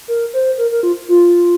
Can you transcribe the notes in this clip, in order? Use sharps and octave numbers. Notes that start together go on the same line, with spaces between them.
A#4
C5
A#4
A#4
F4
F4